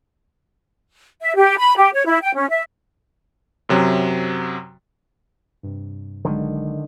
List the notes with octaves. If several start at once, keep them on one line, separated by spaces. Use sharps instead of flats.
E5
G4
B5
G4
C#5
E4
G5
C#4
E5
F#2 C3 F#3
G2 C3
A#1 D3 D#3 F#3 G#3